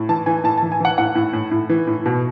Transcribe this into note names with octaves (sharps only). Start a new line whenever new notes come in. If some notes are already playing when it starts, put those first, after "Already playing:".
Already playing: A2
E3 A5
E3 G#5
A2 A5
A5
E3
G#5
E3 F#5
A2 F#5
A2
A2
A2
E3
A2
B2